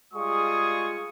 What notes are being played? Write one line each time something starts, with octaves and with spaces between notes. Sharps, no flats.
G3 G#3 F4 G#4 C#6 D#6